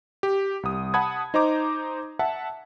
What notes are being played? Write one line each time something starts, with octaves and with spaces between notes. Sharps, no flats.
G4
C2 D#6
F#5 A5 B5 D#6 G#6
D#4 C5 D#5 A#5 D6
E5 F#5 A5